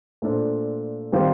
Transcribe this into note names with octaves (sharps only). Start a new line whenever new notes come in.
A#2 A3 D4 A4 C5
D#3 G3 C4 F4 C5